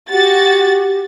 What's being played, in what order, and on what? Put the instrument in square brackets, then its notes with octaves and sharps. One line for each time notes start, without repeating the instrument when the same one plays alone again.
[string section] F#4 A6 [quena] G4